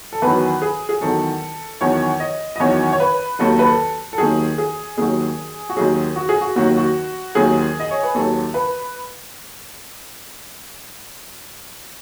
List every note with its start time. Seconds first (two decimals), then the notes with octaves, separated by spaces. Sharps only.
0.13 A4
0.22 E2 D#3 F#3 B4
0.62 G#4
0.89 G#4
1.01 E2 D#3 F#3 A4
1.81 E2 D#3 F#3 C#5
2.20 D#5
2.56 D#5
2.60 E2 D#3 F#3 C#5
2.92 C#5
3.00 B4
3.39 D#2 D#3 F#3 A4
3.59 B4
3.65 A4
4.13 A4
4.18 D#2 D#3 F#3 G#4
4.58 G#4
4.97 D#2 D#3 F#3 G#4
5.69 F#4
5.76 D#2 D#3 F#3 G#4
6.16 F#4
6.29 G#4
6.41 F#4
6.56 D#2 D#3 F#3 F#4
6.77 F#4
7.35 D#2 D#3 F#3 G#4
7.80 D#5
7.91 C#5
8.03 B4
8.15 D#2 D#3 F#3 A4
8.54 B4